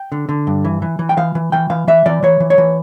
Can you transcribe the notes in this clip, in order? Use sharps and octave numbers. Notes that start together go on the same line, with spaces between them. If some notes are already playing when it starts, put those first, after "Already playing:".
Already playing: G5
D3
D3
G2
E3
E3
E3
G5
E3 F5
E3
E3 G5
E3 F5
E3 E5
E3 D5
E3 C#5
E3
C#5
E3